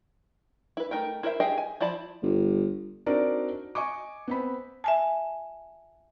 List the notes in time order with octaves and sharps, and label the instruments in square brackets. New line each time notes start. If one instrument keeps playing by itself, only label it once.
[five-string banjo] E4 B4
A3 D#4 A#4 G5
E4 A#4 C5 D5 E5
G4 G#4 D#5 E5 G5
G#5
F3 E4 D5 A5 B5
[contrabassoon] G1
[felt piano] C4 D4 D#4 F#4 A#4 D5
D#5 G#5 C#6 D6
B3 C4 B5
[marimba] E5 G#5 A5